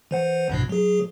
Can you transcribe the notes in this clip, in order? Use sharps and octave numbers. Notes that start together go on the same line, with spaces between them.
E3 C5 F#5
A#1 G2 B2
F#3 G#4